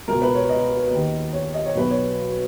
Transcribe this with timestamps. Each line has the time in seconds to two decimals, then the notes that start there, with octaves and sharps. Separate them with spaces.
0.08 C#2 B2 A#4
0.22 B4
0.35 C#5
0.49 D#5
0.91 D#2 D#3
1.33 C#5
1.54 D#5
1.66 C#5
1.75 B1 B2 B4
1.91 C#5